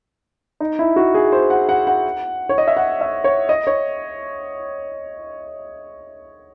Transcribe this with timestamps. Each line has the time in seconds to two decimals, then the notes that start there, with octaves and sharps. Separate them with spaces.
0.60 D#4
0.79 E4
0.96 F#4
1.14 G#4
1.32 C5
1.50 F#5
1.69 F#5
1.87 F#5
2.49 C#5
2.58 D#5
2.68 E5
2.77 F#5
3.01 E5
3.24 C#5
3.49 D#5
3.67 C#5